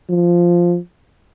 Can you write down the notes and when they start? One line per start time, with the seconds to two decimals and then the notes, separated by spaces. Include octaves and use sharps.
0.10 F3